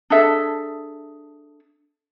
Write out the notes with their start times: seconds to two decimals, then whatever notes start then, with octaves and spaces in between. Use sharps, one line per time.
0.10 D4 G#4 A4 E5